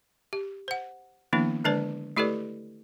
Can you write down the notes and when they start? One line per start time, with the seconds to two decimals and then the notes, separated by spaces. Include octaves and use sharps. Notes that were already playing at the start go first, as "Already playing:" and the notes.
0.33 G4
0.68 C5 F#5
1.33 D#3 F3 A#3 B3 D4 E4
1.64 D3 G#3 D4 B4 C5 D5
2.17 A3 E4 G4 A4 B4 D5